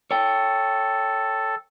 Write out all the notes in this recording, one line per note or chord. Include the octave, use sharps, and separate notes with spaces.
A4 C#5 G5